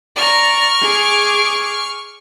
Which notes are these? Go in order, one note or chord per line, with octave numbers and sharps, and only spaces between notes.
D5 A#5 C#6 F6
G#4 D6